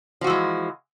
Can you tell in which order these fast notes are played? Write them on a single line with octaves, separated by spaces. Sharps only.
F3 F#4 E3 G#3